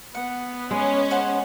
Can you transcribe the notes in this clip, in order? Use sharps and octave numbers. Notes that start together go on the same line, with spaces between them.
B3 F#5
G#3 C#4
G#4 C5 F#5